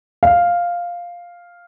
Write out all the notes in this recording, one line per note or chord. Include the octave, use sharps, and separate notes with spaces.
F5